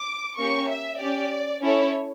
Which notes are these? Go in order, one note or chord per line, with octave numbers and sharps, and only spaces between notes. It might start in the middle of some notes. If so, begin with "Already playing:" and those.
Already playing: D6
A#3 C#4 G4 C#6
E5
C#4 G4 D5
C#4 E4 A4 C#5